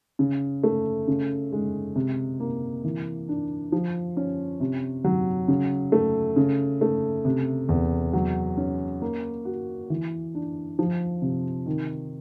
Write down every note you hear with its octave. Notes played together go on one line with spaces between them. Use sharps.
C#3
A3
C#3
G#3
C3
A#3
E3
D4
F3
C#4
C3
F#3
C#3
A3
C#3
A3
C3
E2
F#3
C#4
A#3
F#4
E3
D4
F3
C3
D#3